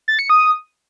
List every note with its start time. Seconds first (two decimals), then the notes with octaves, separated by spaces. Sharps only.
0.08 A6
0.19 C#7
0.30 D#6